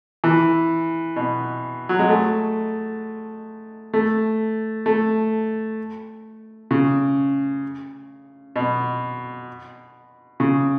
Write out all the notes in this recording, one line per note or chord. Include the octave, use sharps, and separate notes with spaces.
E3
B2
F#3
G#3
A3
A3
A3
C#3
B2
C#3